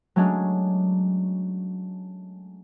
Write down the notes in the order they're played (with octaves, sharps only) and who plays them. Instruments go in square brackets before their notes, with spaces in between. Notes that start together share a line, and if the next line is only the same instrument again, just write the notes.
[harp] F#3 G#3 A3 C#4 D4 G#4